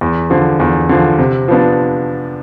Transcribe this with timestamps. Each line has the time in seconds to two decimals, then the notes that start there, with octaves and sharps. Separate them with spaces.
0.01 E2
0.30 D3 F3
0.60 E2
0.89 D3 F3
1.18 C3
1.48 F3 B3 D4